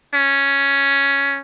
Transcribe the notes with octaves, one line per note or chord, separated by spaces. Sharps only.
C#4